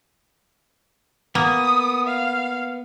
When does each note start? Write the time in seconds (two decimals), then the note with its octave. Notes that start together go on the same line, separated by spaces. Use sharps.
1.35 A#3 B3 D#6
2.07 F5